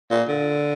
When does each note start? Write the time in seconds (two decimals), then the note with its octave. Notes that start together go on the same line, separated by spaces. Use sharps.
0.11 A#2
0.28 D3